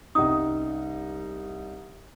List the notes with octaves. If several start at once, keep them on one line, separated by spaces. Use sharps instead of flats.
C2 C#4 D#4 D#6